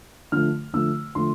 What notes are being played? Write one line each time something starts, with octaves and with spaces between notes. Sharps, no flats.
D3 F3 A3 F6
D3 F3 A3 E6
D3 F3 A3 C6